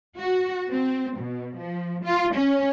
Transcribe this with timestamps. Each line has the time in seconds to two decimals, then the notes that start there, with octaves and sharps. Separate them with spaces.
0.18 F#4
0.70 C4
1.19 B2
1.57 F3
2.04 F4
2.35 C#4